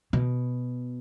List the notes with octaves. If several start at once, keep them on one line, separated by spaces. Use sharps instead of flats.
B2